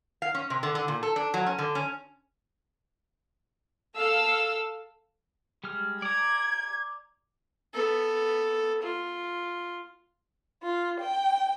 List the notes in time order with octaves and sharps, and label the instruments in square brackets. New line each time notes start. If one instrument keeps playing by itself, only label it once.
[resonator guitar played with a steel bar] F5
C#4
C3
D3
D3
A#2
A4
D4
F#3
C#4
D3
C#4
[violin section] A4 F5 E6
[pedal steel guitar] G3 G#3 F6
[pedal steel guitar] D5 A#5 [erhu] G#6
[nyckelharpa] B3 A4
F4
[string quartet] F4
G5